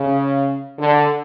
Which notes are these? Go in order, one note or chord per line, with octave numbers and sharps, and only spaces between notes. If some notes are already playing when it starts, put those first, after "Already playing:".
Already playing: C#3
D3